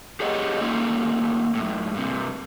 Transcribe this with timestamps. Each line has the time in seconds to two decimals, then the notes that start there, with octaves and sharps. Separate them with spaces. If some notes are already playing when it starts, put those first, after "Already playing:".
0.20 G4 G#4 C#5 D#5 F#5
0.61 A3 A#3 C#4 D#4 F4 A4
1.55 F#2 A2
1.94 G2 C3